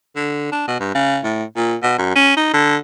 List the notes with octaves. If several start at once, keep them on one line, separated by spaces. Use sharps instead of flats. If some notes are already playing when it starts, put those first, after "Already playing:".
D3
D4
B2
G2
C#3
A2
A#2
B2
F#2
C#4
D#4
D3